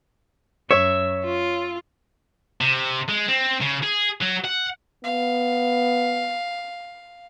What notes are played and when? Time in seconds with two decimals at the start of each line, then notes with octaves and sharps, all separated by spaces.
0.71 F#2 C#5 E5
1.25 F4
2.61 C3
3.08 G#3
3.28 C4
3.61 C#3
3.83 G#4
4.21 F#3
4.44 F#5
5.04 B3 F5